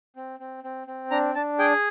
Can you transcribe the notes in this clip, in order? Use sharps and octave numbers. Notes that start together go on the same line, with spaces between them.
C4
C4
C4
C4
D4 A#5
D4 A5
G#4 G5